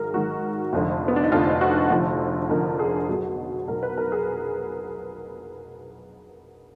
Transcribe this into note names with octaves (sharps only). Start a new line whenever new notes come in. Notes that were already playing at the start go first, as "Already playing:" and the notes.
Already playing: G#1 G#2 D#3 F#3 G#4 A#4
G#1 G#2 D#3 F#3 F#4
F1 F2 D3
B3
D4
D#4
F1 F2 D3 F4
F#4
F1 F2 D3 F3
F1 F2 D3 F3 A#4
G#4
B1 B2 F#3
B1 B2 F#3 A#4
B4
A#4
G#4